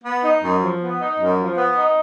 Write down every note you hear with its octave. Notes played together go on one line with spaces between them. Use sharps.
B3
D#4
F#2
F3
B3
D#4
F#2
F3
B3
D#4